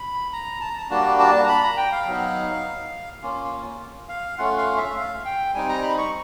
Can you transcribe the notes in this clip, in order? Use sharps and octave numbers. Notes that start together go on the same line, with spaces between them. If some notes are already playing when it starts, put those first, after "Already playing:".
Already playing: B5
A#5
A5
A#5
A5
G3 A#3 D4 F#4 A5
A5
A#5
B5
A#5
G5
F5
F#3 B3 D#4
A#3 C#4 F4
F5
A3 C#4 F4 F#5
F5
E5
F5
G5
G3 C4 D#4 G#5
A#5
B5
C#6